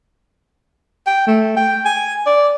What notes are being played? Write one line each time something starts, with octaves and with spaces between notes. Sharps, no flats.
G5
A3
G5
G#5
D5